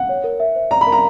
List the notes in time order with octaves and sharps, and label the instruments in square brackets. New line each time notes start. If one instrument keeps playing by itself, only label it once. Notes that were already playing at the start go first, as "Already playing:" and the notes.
Already playing: [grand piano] F#5
[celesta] C#5
A#4
E5
C5
[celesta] D5 [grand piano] A#5
[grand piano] B5
[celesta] A#4
[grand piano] A#5